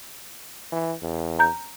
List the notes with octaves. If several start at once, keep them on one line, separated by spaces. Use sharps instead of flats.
E3
E2
A#5 G6